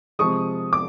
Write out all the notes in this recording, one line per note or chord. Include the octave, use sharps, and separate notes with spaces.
C3 F3 G#3 C#6 D#6
D6